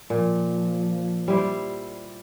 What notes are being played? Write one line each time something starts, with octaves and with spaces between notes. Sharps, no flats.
A#2 F3
G3 E4 C5